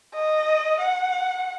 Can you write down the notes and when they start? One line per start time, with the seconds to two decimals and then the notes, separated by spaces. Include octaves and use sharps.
0.14 D#5
0.80 F#5